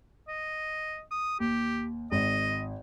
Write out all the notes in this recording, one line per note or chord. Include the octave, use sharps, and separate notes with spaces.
D#5
D#6
D#2 G4
G#1 D#5